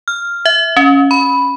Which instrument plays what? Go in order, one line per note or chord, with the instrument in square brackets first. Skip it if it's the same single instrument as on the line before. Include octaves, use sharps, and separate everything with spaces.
[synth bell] F6
E5
C#4
B5